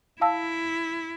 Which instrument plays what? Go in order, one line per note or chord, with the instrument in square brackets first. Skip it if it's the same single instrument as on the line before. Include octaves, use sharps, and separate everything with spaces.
[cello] E4 [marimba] F5 A5 E6